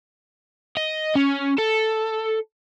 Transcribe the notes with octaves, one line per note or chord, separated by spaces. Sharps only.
D#5
C#4
A4